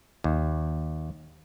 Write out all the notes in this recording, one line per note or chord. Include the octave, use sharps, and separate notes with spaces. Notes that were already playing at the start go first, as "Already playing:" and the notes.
D#2